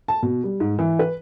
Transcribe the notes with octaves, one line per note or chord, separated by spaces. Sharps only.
A5
B2
G3
G#2
E3
B4